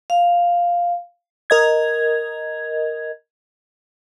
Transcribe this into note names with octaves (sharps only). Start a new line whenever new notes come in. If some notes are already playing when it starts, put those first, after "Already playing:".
F5
A#4 D#5 G#6